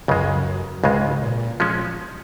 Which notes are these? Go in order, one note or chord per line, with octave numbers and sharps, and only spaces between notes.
C#2 F#2 C#3 G#3
C#2 G#2 C#3 G#3
A#2
F3 G#3 C#4